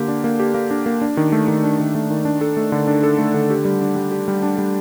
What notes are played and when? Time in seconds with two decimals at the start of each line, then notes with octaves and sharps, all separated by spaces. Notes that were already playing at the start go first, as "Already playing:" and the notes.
Already playing: D3 A#3 G4
0.08 D4
0.24 A#3
0.40 G4
0.54 A#3
0.71 D4
0.86 A#3
1.02 D4
1.17 D#3
1.32 A3
1.48 D#3
1.63 D4
1.80 D#3
1.95 A3
2.10 D#3
2.25 D4
2.41 A4
2.57 A3
2.72 D3
2.87 D4
3.03 A4
3.18 A3
3.34 D3
3.50 G4
3.65 G3
3.81 D4
3.96 G3
4.12 G4
4.28 G3
4.43 D4
4.58 G3